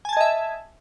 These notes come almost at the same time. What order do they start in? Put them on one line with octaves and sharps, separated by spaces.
G#5 A5 G#6 D#5 E5